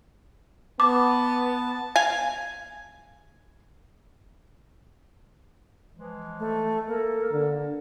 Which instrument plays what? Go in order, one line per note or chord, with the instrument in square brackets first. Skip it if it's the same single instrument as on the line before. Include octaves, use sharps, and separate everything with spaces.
[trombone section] B3 [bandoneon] A5 [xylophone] D6
[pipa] F5 G#5
[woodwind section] E3 F3 G#3
[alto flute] A3
[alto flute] A#3 [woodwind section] A4
[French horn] D3